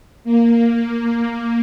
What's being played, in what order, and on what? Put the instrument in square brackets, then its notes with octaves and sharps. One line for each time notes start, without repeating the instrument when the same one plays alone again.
[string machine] A#3